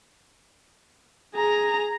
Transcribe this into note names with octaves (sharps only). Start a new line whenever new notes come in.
G#4 A#5